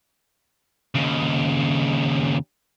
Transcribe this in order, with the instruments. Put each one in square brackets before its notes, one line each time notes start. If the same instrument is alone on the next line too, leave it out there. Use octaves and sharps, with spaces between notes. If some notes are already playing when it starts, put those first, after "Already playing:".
[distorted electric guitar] D#2 C#3